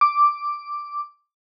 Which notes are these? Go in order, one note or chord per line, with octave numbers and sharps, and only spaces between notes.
D6